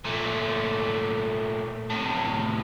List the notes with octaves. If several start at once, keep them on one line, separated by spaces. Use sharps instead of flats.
A#2 A3
A2 C3